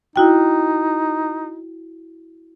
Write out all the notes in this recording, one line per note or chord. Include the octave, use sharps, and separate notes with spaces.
D#4 E4 F#4 G5